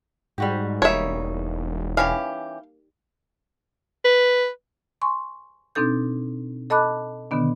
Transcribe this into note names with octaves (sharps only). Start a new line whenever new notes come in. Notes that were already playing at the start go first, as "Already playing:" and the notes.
G#2 G3 F#4 G4
E1 G3 A#3 D#4 C#5 E5
E3 C#4 G4 F5
B4
G#5 C6 C#6
B2 C4 D4 D#4 A4 G6
A4 D#5 A5 B5 D6 F#6
B2 D3 D#3 B3 D4